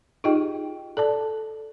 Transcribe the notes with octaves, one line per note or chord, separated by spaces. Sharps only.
D#4 F4 G4 G#4 D#5 G5
A4 D5 A5